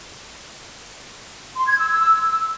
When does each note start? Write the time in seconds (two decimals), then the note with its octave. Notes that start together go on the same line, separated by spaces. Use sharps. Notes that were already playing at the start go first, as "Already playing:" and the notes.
1.56 C6
1.67 G#6
1.78 E6
1.89 E6